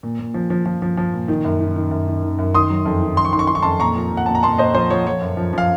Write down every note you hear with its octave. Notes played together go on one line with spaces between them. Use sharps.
A#2
A#2
F3
F3
F3
F3
F3
A#2
D#3
F#2
D#3
D#3
F#2
D#3
D#3
F#2
D#3 C6 D#6
F#3
F2
D#3
F2 C6
C#6
D#3 C6
C#6
D#3 C6
C#6
F2 A5 C6
A#2 A#5 C#6
F3
A#2
F#5
A#2 A5
A#5
A#2 A5 C6
A#2 C5 D#5
F3 C5
F3 C#5
F3 C#5
F#2
F3
F3 F5